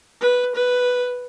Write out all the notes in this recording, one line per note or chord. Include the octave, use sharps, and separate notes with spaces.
B4
B4